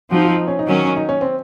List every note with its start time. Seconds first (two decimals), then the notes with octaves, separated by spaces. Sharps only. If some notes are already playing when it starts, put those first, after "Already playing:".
0.11 F3 C4 D#4 F#4
0.25 F4
0.36 D#4
0.48 C#4
0.59 D#4
0.67 D#3 F#3 C#4
0.96 D#4
1.09 C#4
1.21 C4